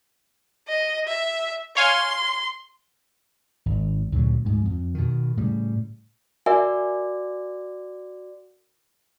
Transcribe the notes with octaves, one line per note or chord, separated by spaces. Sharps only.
D#5
E5
C#5 F5 G#5 C6
G#1
D2 A#2 C#3 F#3
D2 G#2
F2
B2 D#3
A2 C#3 G3
F#4 A#4 D5 E5 G#5